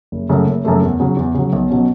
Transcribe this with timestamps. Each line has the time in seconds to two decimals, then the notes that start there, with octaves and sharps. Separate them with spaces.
0.12 F#1
0.29 F#2 C#3 A3
0.47 F#1
0.65 F#2 C#3 A3
0.82 E2
1.00 C#3 F#3
1.17 E2
1.34 C#3 F#3
1.53 B1
1.70 B2 F#3 C#4